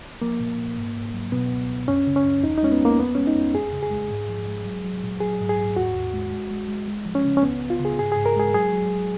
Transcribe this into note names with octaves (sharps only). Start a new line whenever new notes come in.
F3 A#3
A#2
A#2
G#2
G#2
F#3
B2 B3
C#2
C#2
F#2 C#4
C#3
C#4
F#2
D#2 D#4
D#4
G#3 C#4
B3
G#3 A#3
F2 B3
G#3 C#4
D#4
F2
F#2 G#4
C#3
G#4
G#3
G#2
F3
G#3
F#3
F#3
A#2
F#3 G#4
G#2
G#4
G#2
D#2 F#4
D#2
G#3
G#3
G#3
G#3
G#3
F3
C#4
C#3
C#4
C#2 B3
C#2
F4
C#3
G#4
G#2 G#4
G#4
G#2
A#4
G#3 G#4
F#3 G#4
F#3
F#3